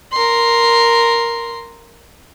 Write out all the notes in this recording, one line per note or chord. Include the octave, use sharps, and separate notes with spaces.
A#4 C6